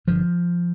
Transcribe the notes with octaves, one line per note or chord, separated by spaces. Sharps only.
G1 G2 D3 F3